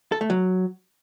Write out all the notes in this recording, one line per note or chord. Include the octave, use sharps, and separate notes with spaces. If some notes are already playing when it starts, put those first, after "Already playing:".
A4
A3
F#3